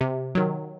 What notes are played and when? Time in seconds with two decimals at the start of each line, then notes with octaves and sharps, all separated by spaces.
0.01 C3
0.35 D#3 F#3